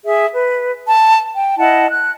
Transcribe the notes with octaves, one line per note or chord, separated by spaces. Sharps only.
G#4 E5
B4
A5
G5
E4 D#5 F#5 A5
F#6